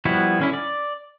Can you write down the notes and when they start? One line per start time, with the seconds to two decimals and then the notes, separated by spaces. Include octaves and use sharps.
0.05 F3 G3 B3 E4 F#4
0.40 D3 C#4 E4
0.53 D5